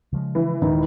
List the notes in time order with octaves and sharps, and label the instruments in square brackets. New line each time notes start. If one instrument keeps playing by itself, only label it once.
[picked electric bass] C#3 F3 G#3
[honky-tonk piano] E3
[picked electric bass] D#1 G#3 [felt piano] D#3